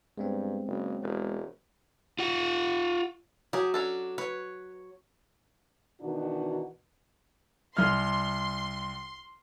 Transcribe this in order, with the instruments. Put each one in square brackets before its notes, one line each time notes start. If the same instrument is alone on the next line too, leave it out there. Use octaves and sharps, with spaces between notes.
[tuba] G2 [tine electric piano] G#3 B3 C4
[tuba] F#1
E1
[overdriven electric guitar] F4 F#5
[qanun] F#3 [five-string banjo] G4 G#4
[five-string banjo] C#4 D4 A4
[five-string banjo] B4 [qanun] C#5
[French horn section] B2 D#3 E3 D4 D#4 F#4
[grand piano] C2 F6 [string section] C6